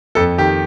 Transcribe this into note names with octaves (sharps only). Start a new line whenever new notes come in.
F2 A4
D#3 G4